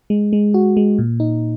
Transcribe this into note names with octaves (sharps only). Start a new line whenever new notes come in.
G#3
G#3
F#4
G#3
A#2
D#4